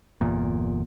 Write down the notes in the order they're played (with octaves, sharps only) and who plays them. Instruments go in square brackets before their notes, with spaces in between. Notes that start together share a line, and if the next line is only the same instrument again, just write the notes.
[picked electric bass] G1 E2 A#2